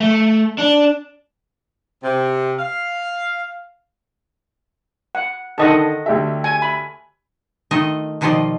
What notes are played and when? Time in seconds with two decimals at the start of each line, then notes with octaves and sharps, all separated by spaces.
0.01 A3
0.58 D4
2.02 C3
2.59 F5
5.15 F#5
5.58 D3 D#3 A4 D#5 F#5
6.06 D2 G4 E5
6.44 G#5
6.62 B5
7.71 D#3 A3 F4 D#5
8.21 B2 D#3 F3 F4 D5 D#5